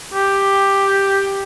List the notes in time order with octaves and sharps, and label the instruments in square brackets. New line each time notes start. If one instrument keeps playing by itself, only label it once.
[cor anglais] G4